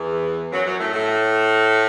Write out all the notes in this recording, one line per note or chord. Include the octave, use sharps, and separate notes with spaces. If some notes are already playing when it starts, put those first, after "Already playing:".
Already playing: E2 E3
F#2 F#3
F#2 F#3
A2 A3
A2 A3